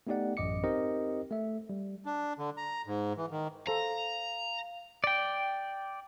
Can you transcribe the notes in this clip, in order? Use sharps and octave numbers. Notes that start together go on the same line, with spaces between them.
A3 B3 D#4 G4 D5 F#5
A1 F#2 D#5 D6 C#7
C4 D#4 G4 A#4 C5 D#5
A3 E5
G3
D4
D3
A#5
G#2
E3
D#3
A4 C5 F5 A#5
D5 G5